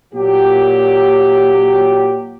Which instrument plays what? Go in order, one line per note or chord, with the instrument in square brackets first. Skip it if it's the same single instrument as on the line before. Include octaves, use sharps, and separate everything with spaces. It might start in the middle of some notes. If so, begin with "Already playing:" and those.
[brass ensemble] A#2 F#3 G4